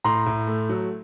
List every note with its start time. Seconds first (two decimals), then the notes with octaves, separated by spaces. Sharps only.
0.04 A2 A#5 C6
0.26 A2
0.47 A3
0.69 F#3